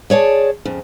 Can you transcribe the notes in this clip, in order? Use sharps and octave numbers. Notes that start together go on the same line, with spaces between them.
G#4 C#5 D5 A5
F2 C#3